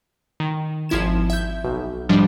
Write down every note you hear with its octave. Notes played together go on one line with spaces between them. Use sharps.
D#3
G#1 F3 E4 G#6 E7
E5 G6
B1
G#2 F3 G3 D4